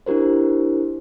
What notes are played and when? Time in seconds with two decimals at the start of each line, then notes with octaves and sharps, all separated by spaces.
0.06 D4 E4 G4 A#4 C5